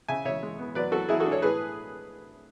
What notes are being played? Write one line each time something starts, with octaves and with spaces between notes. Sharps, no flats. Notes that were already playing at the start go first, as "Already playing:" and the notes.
C#3 E5 G#5
C#3 C#5 E5
G#3
B3
F#3 B4 D5
F#3 F#4 A4
F#3 E4 G#4
F#4 A4
D4
A4 C#5
A2 G#4 B4